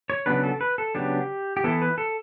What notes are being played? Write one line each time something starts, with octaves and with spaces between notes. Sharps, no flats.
C#5
C#3 F#3 B3 D4 B4
A4
B4
A4
C#3 F#3 B3 D4 G4
G4
E3 B3 E4 A4
B4
A4